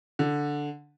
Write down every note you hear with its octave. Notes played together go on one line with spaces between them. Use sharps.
D3